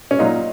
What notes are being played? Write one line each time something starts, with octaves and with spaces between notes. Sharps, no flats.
C#4
A#2 F#3 D#4